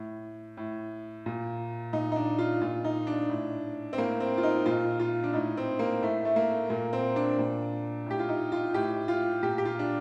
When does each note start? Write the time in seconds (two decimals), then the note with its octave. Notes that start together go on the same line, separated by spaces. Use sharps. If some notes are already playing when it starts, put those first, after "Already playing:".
Already playing: A2
0.57 A2
1.26 A#2
1.93 A#2 D#4
2.12 D#4
2.16 D4
2.39 F4
2.61 A#2 F4
2.85 D#4
3.07 D4
3.30 A2
3.93 C4
3.98 A2 A#3
4.20 C4
4.38 F4
4.43 D#4
4.66 A#2 F4
4.99 F4
5.24 D4
5.34 A2 D#4
5.57 C4
5.79 A#3
6.02 A2 A3
6.25 A3
6.36 A#3
6.70 A#2 A#3
6.93 C4
7.16 D4
7.39 A#2
8.06 A2 G4
8.19 F4
8.29 D#4
8.52 F4
8.74 A2 G4
9.08 F4
9.43 A#2 G4
9.58 G4
9.65 F4
9.79 D4